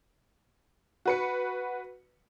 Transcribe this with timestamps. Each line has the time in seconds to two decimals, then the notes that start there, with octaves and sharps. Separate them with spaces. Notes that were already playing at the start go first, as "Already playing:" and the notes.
1.05 F#4 B4 C#7